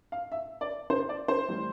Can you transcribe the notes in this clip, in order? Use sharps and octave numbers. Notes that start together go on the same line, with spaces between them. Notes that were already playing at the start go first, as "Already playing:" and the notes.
F5
E5
D5
C5
D5
C5
A2 E3 G3